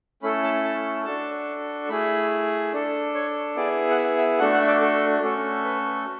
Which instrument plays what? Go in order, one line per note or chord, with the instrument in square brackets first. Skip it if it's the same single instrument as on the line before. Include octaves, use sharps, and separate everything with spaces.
[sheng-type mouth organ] A3 C#4 E4 A4 B5
A5
A5
D4 F#4 A4 A5
A3 E4 G#4 B5
D4 A4
C#5
B3 E4 G#4 D5
F#5
E5
E5
A3 D4 F#4 A4 F#5
F#5
E5
D5
A4
A3 C#4 F#4 A4
B4